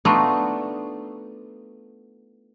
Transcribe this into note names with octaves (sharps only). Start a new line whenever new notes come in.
A3 B3 D4 D#4 F4 F#4